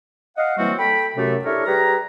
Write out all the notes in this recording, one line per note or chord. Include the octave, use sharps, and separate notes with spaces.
D#5 F5 F#5
E3 F#3 G3 A#3 C4 F#4
A4 G5 B5
F#2 C3 A3
D4 E4 G4 A4 A#4 C#5
G3 G4 G#4 B4 A#5